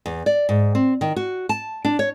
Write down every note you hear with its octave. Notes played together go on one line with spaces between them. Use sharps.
E2
D5
G#2
C4
D#3
F#4
A5
D4
C#5